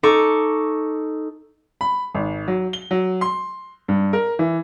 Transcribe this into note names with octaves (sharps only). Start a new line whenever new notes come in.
D#4 A4 C#6 D6
B5
G#1
F#3
G7
F#3
C6
G2
A#4
E3